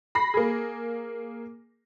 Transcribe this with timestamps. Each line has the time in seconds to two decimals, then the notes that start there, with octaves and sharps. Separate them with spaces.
0.15 B5 A#6 C7
0.34 A#3 G#4